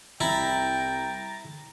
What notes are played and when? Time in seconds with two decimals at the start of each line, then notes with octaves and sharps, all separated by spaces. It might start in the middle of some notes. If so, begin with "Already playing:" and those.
0.21 C2 E4 G5 A#5 A6